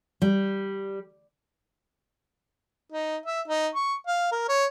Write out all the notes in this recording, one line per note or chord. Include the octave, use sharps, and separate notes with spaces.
G3
D#4
E5
D#4
C#6
F5
A#4
C#5